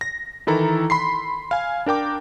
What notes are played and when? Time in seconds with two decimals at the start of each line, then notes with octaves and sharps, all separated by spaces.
0.01 A#6
0.47 D#3 E3 E4 A4 A#5
0.90 B5 C6 C7
1.51 F5 G#5
1.86 D4 A#4 G5 D6